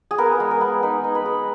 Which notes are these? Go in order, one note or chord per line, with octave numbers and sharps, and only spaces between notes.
G#4
B3 A#4
G#3
A#4
B3
D#4 B4
D#4
B4
G#3